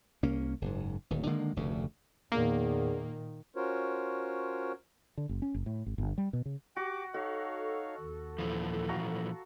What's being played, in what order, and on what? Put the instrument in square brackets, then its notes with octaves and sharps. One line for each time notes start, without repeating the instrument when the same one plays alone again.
[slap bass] C2 A#3 C#4
F#1 G#2
D1 D#2
D3 D#3 G#3 A#3
F1 D2 C#3
[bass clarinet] E2 [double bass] A#2 D#3 [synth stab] A#3
[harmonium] C#4 F4 F#4 A#4 C5 C#5
[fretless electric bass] D3
F#1
C#4
F#1
A2
G#1
G1
G3
B2
C#3
[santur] F#4 [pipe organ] G4 D6
[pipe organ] D#4 C#5 F5 [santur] F#4 [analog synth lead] A4
[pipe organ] D#2
[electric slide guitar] A#2 E3 F3
[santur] F#4 F5 A#5